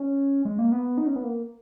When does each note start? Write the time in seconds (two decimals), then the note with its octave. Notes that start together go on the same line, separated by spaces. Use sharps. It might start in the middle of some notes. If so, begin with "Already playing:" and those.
Already playing: C#4
0.45 G#3
0.59 A#3
0.72 B3
0.98 D#4
1.06 C#4
1.16 B3
1.24 A#3